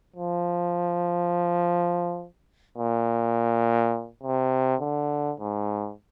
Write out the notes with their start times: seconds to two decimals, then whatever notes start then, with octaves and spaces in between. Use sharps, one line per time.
0.16 F3
2.77 A#2
4.23 C3
4.81 D3
5.40 G#2